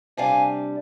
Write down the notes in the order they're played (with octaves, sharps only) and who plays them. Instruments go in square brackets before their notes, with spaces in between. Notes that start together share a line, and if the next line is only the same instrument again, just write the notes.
[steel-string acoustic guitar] C3 G3 D4 F5 G#5